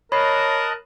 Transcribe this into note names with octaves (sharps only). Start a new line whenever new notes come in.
A#4 C#5 D#5 A5 B5 F#6 C7